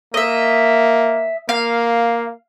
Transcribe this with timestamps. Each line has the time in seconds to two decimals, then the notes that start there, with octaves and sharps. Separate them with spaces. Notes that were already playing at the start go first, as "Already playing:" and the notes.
0.14 A#3 D#5 E5
1.49 A#3 F5